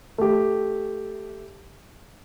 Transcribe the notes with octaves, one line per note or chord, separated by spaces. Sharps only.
A3 G4